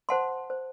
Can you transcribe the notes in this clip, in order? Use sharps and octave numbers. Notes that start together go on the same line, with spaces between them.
C5 F#5 A5 C6
C5